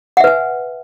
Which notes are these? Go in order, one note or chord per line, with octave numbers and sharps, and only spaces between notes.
B4 E5 F#5 G#5